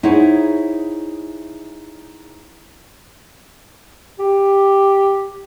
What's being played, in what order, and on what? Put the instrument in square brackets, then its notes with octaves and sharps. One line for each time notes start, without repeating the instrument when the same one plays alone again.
[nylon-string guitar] D#4 E4 G#4 C5 C#5 F#5
[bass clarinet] G4